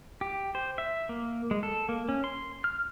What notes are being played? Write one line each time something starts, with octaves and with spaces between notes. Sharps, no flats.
G4
C5
E5
A#3
G#3
A4
A#3
C#4
C6
F6